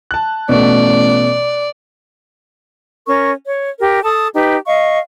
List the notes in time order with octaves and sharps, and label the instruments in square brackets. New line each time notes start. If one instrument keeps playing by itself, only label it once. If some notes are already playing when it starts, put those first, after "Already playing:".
[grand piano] A5 F#6
[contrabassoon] A1 [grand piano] B2 A3 [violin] D5
[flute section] C#4 A#4 C#6
C#5
G4 A#4
A4 A5 D#6
D#4 G4 B4
D#5 F5 C#6